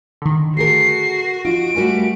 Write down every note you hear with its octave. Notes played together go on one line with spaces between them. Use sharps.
D3 D#3
A3 F#4 G#4 A#4 C7
F3 D#4 F4 D7
G3 A3 F#4 A#4 G#5